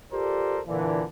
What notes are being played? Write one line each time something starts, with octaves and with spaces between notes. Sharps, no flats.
F4 G4 A4 A#4 C5 D5
A#2 D3 E3